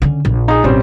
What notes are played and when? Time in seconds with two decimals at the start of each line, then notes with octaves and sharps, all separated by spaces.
0.02 D3 C#4
0.25 A#1
0.48 D#4 G#4
0.64 A1 B2 G3 C4 C#4